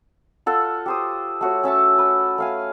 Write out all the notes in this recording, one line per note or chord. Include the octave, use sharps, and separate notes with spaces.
F4 A4 F#5
G4 C5 D#6
A3 F#4 C#5
C#4 E5 A5 C#6
B4
A3 F5 G#5